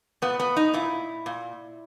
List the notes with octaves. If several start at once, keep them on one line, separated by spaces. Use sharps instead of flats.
A#2 B3
B3
D#4
A#2 E4
A#2